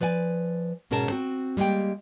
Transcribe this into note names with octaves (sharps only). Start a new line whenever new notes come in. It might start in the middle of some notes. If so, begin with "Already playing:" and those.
F3 B4 D5 G5 G#5
G#2 B2 C#4 G#4 A#4 A5
C4 F#4
G3 G#3 A#3 G4 G5